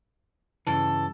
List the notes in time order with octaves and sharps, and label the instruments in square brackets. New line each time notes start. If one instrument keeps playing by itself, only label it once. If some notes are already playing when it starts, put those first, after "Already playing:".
[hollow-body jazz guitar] G2 C#3 E3 [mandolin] A4